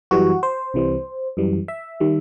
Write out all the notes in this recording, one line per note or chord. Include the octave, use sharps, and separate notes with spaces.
F#2 E3 G3 F#4
C5
C2 C3 E3 G3
F#2 E3 G3
E5
D#3 G3